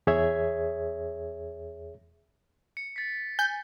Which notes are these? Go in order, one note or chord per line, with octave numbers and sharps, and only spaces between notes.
E2 G#4 C#5 E5 G#6
C#7
A6 B6
G#5 G6